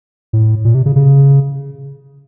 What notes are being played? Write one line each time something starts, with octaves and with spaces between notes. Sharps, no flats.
A2
A#2
C3
C#3
C#3